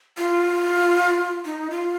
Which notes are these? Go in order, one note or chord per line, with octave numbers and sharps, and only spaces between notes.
F4
D#4
F4